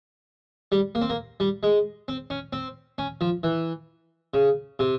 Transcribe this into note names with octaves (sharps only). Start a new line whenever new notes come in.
G3
A#3
C4
A#3
G3
G#3
C4
C#4
C4
C#4
F3
E3
C#3
C3